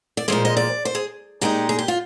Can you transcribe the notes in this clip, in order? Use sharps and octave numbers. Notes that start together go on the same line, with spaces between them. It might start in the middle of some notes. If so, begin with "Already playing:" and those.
D5
A#2 F3 G#3 C5
D#5
D5
C5
G#4
A#2 G#3 D#4 G4
G#4
G4
F4